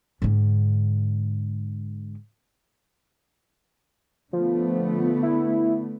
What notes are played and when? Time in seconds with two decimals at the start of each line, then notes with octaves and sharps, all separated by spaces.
0.22 G#2 D3
4.33 D3 F3 A3 B3
5.23 E4